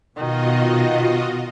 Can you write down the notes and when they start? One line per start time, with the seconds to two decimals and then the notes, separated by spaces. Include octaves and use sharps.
0.16 B2 D#3 F4 F#4 D#5